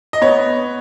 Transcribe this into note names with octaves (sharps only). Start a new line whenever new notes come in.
D#5
B3 C#5